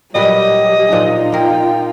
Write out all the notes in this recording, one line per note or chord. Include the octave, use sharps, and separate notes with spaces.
A#2 F#3 G3 G4 B4 D#5
A#2 F3 D4 D#4 F4
A#3 A#4 G5